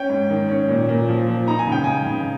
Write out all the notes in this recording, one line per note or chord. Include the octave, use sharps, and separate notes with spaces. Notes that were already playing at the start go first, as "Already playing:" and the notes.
Already playing: C#4 G5
G#2
D#3
C#4
A#2
A#2
F3
F3
D#4 A#5
G#5
C#3 G5
D#4 G#5
C#3